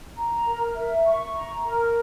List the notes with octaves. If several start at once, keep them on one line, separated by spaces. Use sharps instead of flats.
A#5
A#4
E5
C#6
A#5
A#4